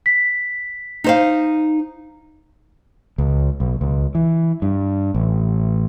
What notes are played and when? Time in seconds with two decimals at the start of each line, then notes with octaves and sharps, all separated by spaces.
0.06 B6
1.04 D#4 C5 F5
3.18 C#2
3.60 B1
3.81 C#2
4.15 E3
4.62 G2
5.15 A1